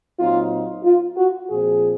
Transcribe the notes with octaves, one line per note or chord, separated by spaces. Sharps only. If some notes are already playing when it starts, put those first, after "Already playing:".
A#2 F#3 C4 D#4 F4
F4
F#4
A#2 F3 C4 G#4